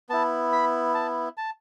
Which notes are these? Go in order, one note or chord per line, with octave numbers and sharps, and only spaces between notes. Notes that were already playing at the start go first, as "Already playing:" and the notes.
B3 E4 A5
B5
A5
A5